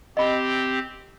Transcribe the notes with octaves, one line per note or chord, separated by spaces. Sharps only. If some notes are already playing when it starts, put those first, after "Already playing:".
C4 G4 D#5 B5